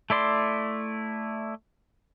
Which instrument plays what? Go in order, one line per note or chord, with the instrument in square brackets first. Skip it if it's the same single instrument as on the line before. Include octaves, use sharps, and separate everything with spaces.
[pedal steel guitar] A3 E4 D5 C6